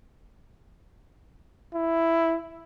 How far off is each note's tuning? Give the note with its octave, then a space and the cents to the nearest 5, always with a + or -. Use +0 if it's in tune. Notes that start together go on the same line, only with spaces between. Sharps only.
E4 +5